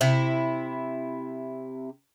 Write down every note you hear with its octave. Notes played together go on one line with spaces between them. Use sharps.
C3 E4